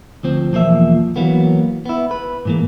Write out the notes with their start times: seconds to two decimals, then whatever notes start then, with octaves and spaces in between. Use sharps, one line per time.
0.23 D2 F3 C4
0.52 B1 E2 F3 A#3 E5
1.16 E3 F#3 A#3 B3
1.86 B3 E4
2.11 B4
2.45 G#2 E3 A#3